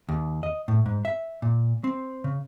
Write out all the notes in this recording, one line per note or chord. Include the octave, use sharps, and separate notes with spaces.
D#2
D#5
A2
G#2
E5
A#2
C4
C#3